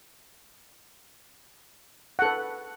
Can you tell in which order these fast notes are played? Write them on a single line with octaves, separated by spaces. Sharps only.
F#5 A4 B4